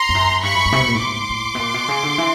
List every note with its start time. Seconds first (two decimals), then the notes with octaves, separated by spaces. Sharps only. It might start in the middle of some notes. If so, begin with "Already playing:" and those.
Already playing: A#5 C6
0.09 F2
0.15 F#2
0.43 G2 B5 C#6
0.54 F#2
0.66 G2
0.72 C3
0.80 B2
0.87 A#2
0.94 A2
1.01 G#2 C6 D6
1.30 A2
1.55 B2
1.59 A#2
1.74 B2
1.88 C#3
2.03 D3
2.18 E3